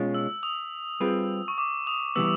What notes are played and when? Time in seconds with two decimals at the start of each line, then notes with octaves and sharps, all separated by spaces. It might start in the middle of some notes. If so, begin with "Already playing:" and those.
Already playing: B2 G#3 C#4 F4
0.15 E6
0.43 D#6
1.00 G3 C4 F4 G#4 B4
1.48 C#6
1.58 D6
1.87 D#6
2.16 C3 E3 G3 B3 E6